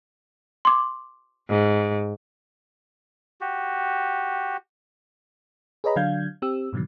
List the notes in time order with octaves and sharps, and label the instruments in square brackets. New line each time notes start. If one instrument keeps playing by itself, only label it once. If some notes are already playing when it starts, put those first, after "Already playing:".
[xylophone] C6 D6
[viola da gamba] G#2
[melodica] F#4 G4
[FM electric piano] G#4 B4 C#5 D#5 A#5 B5
D3 F#3 D4 F5 G6 G#6
C4 G4 E6
G#2 B2 D3 D#3 F#3